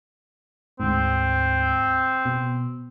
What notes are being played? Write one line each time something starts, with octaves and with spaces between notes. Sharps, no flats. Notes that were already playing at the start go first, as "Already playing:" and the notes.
D2 G#2 C4
B2